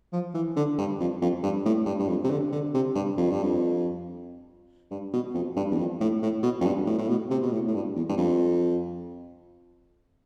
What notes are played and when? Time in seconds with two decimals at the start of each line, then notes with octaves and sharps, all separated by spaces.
0.13 F3
0.35 E3
0.56 D3
0.78 G2
1.00 F2
1.22 F2
1.43 G2
1.66 A2
1.86 G2
1.99 G2
2.08 F2
2.24 C3
2.31 D3
2.52 D3
2.74 C3
2.95 G2
3.18 F2
3.31 G2
3.43 F2
4.91 G2
5.14 B2
5.34 F2
5.56 G2
5.72 E2
5.78 F2
6.01 A2
6.23 A2
6.43 B2
6.61 F2
6.66 G2
6.87 A2
6.98 A2
7.09 B2
7.31 C3
7.43 B2
7.53 A2
7.68 A2
7.75 G2
7.96 E2
8.09 G2
8.18 F2